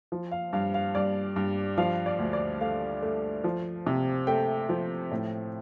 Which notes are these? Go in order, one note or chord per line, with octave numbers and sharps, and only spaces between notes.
F3
F5
G2 F5
F5
G2 D5
G2
F3 F5
D5
D2
D5
A3 F5
A3
F3
C3
A3 G5
F3
A2